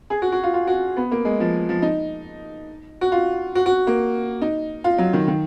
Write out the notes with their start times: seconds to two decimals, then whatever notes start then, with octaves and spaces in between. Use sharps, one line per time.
0.10 G#4
0.22 F#4
0.32 F#4
0.43 F4
0.54 F4
0.67 F#4
0.97 B3
1.11 A#3
1.25 G#3
1.40 F3
1.69 F3
1.82 D#4
3.01 F#4
3.12 F4
3.55 F#4
3.66 F#4
3.87 A#3
4.42 D#4
4.84 F4
4.98 F#3
5.13 D#3
5.27 D#3